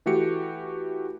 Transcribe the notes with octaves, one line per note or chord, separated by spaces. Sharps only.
E3 A3 F#4 G4 C#7